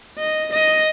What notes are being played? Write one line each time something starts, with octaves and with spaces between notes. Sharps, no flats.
D#5
D#5